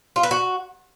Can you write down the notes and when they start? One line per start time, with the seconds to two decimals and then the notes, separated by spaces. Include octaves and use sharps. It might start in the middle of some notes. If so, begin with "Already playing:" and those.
0.16 F4
0.23 B4
0.31 F#4